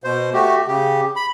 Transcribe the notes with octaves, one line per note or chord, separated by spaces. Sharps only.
B2 C5
A3 F#4 G4
C#3 G4
B5